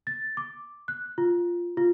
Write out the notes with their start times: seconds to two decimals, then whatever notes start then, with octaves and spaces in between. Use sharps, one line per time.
0.07 A6
0.37 D6
0.88 F#6
1.18 F4
1.77 F4